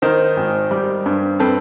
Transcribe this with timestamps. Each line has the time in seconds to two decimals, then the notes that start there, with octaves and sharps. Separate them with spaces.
0.02 D#3 A#4 C5
0.37 G#1
0.71 G3
1.06 G2
1.39 C4 A4 B4